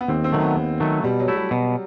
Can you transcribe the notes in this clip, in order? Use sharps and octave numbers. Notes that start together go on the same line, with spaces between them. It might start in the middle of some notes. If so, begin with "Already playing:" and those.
B3
D#2 C4
C4
D#3 F#3 A3
B3
D#2
D#3 F#3 A3
B2 G3
F#3
A3 E4
G3
B2